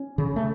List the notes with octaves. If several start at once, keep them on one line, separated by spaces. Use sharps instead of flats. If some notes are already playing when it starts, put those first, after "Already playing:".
Already playing: C#4
C#3
A3